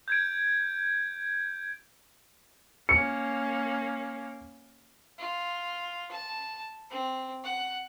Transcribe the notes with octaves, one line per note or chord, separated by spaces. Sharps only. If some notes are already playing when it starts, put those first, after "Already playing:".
G6 G#6 D7
A#3 C#4 C#7
F4
A5
C4
F#5